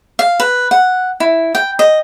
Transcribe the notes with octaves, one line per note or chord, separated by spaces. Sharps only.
F5
B4
F#5
E4
G5
D#5